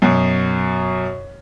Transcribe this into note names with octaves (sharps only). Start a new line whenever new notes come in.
F#2 B2